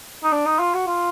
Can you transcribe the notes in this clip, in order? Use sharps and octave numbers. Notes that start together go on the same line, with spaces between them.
D#4
D4
D#4
F4
F#4
F4